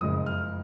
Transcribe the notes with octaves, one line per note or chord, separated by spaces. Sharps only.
F#1 F2 C#3 G#3 D#6
F6